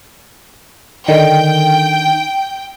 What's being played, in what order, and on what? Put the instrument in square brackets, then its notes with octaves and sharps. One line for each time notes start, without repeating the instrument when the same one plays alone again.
[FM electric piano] D3 D#3 [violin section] G5